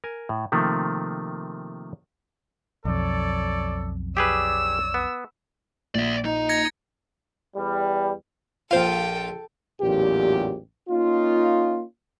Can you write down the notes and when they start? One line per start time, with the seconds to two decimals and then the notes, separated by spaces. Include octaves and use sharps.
0.04 A#4 G#5
0.29 A2
0.52 C3 D#3 F3 A3 A#3
2.85 B1 F2 A4 C#5 D5
4.17 G4 G#4 B4 C#5 D5 E6
4.94 B3
5.95 A#1 D5 E5
6.25 D#4 D#5
6.49 G#6 A#6 C#7
7.56 E2 G3
8.71 A#1 F4 A4 C5 F5 G5
9.82 A1 E2 A#2 F#3 G4
10.89 A#3 C#4 D#4 F4